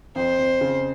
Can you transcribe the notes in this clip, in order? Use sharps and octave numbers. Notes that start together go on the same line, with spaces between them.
F2 C5
F2
C#3